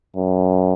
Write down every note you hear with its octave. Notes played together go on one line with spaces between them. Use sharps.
F#2